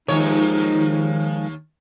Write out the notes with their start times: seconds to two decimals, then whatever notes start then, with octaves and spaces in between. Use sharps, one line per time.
0.08 D#2 D#3 F3 G#3 D#4 C#5